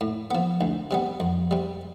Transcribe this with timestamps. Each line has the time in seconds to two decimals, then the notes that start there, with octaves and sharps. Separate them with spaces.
0.01 A2
0.31 F3 B3
0.61 D2
0.91 C3 G3 B3
1.20 F2
1.51 C3 G3